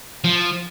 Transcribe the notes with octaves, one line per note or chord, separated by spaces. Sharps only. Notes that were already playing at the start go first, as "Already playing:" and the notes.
F3